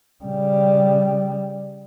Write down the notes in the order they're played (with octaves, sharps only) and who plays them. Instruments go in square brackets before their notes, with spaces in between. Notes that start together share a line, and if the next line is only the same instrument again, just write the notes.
[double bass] C#3 G3